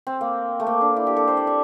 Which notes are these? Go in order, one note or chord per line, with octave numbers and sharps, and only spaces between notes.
C4
A#3
A3
A#3
D4
E4
G4
A4
C5
D5
E5